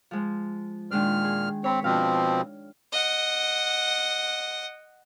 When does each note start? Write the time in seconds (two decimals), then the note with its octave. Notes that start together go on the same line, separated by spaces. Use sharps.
0.11 F3 G#3
0.91 A#2 D#3 G#3 D4 F6
1.24 G#4
1.64 C4 C#5 B5
1.84 B2 F3 C4 D4 F5
2.93 D#5 F#5